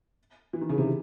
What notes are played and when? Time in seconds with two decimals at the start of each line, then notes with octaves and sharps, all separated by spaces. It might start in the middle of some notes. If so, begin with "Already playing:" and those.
0.53 E3
0.61 D#3
0.69 C#3
0.78 C3